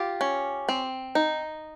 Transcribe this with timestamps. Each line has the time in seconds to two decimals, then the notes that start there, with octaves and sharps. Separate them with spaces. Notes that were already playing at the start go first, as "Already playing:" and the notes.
Already playing: F4 G4
0.21 C#4
0.69 C4
1.15 D#4